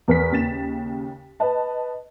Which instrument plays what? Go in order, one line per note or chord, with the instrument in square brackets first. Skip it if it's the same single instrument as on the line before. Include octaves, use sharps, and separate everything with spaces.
[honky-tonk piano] E2 A#4 B4 B6
D#2 C#3 A6 E7
B4 D#5 A5